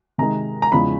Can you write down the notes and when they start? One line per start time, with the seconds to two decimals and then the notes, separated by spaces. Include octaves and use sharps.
0.18 C3 D#3 G#3 A#5
0.62 A#5
0.72 E2 C#3 F3 G#3 B5